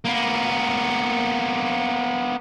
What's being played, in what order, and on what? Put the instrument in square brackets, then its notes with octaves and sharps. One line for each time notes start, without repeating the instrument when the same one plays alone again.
[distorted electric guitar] A#3 B3